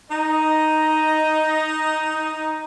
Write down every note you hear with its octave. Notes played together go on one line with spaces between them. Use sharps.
D#4 D#5